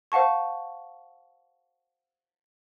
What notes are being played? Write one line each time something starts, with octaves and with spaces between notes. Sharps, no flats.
C5 F5 F#5 A5 C#6